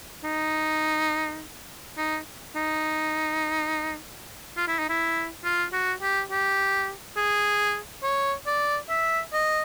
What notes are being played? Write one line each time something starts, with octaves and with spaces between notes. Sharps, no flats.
D#4
D#4
D#4
F4
E4
D#4
E4
F4
F#4
G4
G4
G#4
C#5
D5
E5
D#5